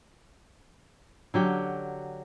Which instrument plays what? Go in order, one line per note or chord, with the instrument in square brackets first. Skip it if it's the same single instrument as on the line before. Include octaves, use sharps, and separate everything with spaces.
[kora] D3 F#3 G4